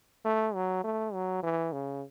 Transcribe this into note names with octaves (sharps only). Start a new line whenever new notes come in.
A3
F#3
A3
F#3
E3
C#3